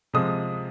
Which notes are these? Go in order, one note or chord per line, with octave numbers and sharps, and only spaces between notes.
C3 F3 G#3 D#6